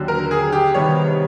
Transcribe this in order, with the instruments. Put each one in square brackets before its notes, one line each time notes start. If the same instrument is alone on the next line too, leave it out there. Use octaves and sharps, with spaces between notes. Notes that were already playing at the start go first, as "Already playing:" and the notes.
Already playing: [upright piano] D#2 D3 F#3
A#4
G#4
G4
C3 D#3 G3 B3 C#5